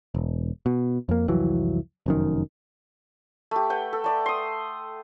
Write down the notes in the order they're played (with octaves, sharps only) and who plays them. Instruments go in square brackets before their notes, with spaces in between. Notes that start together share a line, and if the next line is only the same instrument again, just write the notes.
[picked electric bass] E1
B2
F2 A#3
C2 F2 E3 F#3
F1 F#2 D#3
[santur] A3 G4
B4 F#5 G5
A4
A3 D5 D6
C6 D#6